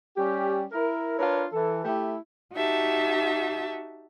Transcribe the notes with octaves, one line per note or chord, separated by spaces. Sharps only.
G3 C#4 G4
E4 A#4
D4 F4 A#4 B4 C#5
E3 A4
A3 E4 G4
D#4 F#4 G4 E5 A5